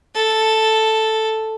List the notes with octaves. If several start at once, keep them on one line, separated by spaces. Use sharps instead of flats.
A4